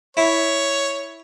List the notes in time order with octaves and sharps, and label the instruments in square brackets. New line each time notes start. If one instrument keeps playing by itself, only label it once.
[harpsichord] E4 [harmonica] C#5